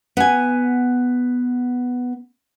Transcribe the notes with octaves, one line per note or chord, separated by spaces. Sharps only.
B3 G#5